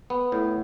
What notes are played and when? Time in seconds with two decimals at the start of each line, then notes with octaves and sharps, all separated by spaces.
0.10 B3
0.32 A2